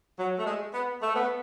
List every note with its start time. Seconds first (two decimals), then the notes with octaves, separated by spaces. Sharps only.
0.19 F#3
0.38 A3
0.45 G#3
0.74 B3
1.02 A3
1.15 B3